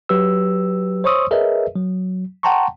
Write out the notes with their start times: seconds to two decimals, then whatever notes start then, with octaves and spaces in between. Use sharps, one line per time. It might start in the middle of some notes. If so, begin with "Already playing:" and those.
0.09 F#3 G4 B4 E6
1.04 C5 C#5 C6 C#6 D#6 E6
1.31 G#4 A#4 B4 C#5 D#5 E5
1.76 F#3
2.43 F#5 G5 A5 A#5 C6 C#6